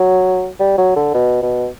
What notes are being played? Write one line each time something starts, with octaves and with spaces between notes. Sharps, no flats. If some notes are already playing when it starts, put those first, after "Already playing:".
Already playing: F#3
G3
F#3
D3
B2
B2